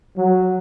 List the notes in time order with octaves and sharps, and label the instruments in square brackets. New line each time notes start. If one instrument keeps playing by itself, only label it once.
[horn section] F#3